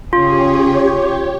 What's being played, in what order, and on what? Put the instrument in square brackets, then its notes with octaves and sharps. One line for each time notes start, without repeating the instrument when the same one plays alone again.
[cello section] C#3 C#4 G#4 [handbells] F4 [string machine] G4 C#5